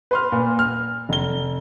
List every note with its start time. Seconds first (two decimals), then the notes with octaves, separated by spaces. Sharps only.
0.11 B4 C6 F6
0.32 A#2
0.59 F6
1.09 F1 G7